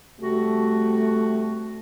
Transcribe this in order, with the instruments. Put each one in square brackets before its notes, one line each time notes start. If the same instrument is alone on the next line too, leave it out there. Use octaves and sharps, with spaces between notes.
[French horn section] C3 G3 A3 [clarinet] F#4